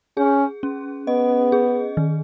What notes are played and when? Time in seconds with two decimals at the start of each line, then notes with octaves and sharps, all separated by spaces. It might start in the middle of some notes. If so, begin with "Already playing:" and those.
0.17 C#4 G#4
0.63 C#4
1.07 B3 D#5
1.52 G#4
1.97 D#3